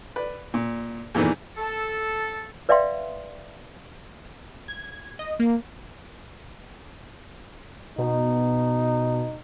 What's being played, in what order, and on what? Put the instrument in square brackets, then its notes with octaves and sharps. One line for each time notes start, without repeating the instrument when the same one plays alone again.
[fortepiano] B4 D5
A#2
E2 A#2 D#3 E3
[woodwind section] A4
[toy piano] B4 D5 E5 F5 G5 C6
[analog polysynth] G#6
D#5
A#3
[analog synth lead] B2 [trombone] D#4